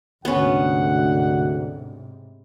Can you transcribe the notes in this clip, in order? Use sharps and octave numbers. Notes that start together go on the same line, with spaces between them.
D2 G#2 C3 B3 C#4 F#5